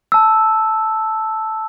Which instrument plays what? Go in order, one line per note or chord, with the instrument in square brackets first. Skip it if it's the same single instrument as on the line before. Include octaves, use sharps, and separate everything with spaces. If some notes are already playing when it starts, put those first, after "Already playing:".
[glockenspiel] A5 E6